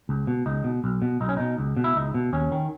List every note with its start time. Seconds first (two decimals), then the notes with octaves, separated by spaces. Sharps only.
0.09 C#2
0.27 B2
0.46 C#2 D#4
0.64 B2
0.84 B1
1.02 B2
1.21 B1 D#4
1.29 C#4
1.37 B2 D#4
1.58 C#2
1.77 B2
1.84 E4
1.96 C#2 D#4
2.14 B2
2.33 D#2 C#4
2.52 D#3